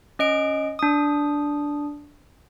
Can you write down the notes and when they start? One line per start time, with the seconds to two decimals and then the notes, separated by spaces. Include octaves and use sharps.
0.19 C#4 D#5 D7
0.79 D4 D#6